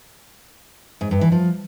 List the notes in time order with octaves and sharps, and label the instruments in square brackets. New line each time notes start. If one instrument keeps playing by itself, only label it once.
[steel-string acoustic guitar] G#2
G2
E3
F3